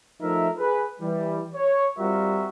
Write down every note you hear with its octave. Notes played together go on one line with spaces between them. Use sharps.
F3 A3 D#4 A#4 E5
G#4 B4
E3 G3
C#5
G3 C4 F4 F#4 A#4 E5